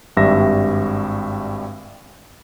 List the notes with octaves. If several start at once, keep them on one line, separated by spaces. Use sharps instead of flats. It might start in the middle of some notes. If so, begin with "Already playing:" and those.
G#1 G2 G3 E5 A#6